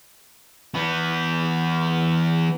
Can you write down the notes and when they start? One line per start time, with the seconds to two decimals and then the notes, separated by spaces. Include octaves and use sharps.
0.74 E3 B3